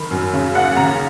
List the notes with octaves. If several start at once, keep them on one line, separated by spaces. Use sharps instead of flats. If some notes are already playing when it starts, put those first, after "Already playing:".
Already playing: D#3 B5
F#2
C#3
D#2 F#5
C#3 A#5